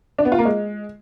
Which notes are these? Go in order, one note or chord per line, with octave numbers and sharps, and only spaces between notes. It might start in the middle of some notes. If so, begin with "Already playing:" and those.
D4
B3
F4
A#3
G#3